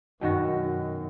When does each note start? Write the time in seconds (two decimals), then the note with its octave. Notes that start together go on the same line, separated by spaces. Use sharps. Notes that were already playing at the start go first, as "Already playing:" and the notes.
0.21 F#2 B2 D#3 F#4